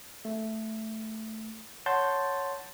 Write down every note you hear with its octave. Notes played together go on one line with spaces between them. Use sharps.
A3
C#5 F#5 A5 C6 G6 A6